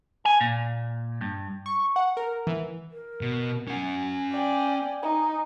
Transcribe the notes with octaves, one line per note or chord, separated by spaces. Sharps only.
G#5
A#2
G2
C#6
F#5
A#4
E3
A#4
B2
C#4 F#5 G#5
D5 G5
D#4